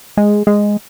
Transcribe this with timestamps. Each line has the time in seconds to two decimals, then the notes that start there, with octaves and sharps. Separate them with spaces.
0.17 G#3
0.47 G#3